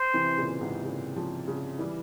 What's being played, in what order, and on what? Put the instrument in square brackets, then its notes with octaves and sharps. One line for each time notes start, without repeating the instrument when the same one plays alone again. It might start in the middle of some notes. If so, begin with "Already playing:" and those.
Already playing: [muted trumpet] C5
[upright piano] C3 E3
A#2 C#3
G#2 C3
A#2 C#3
C#3 F3
C#3 F3
E3 G3